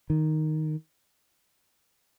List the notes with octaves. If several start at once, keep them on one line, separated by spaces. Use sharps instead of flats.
D#3